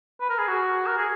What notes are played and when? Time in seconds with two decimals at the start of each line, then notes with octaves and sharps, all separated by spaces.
0.20 B4
0.30 A#4
0.39 G#4
0.48 F#4
0.86 A#4
0.97 G#4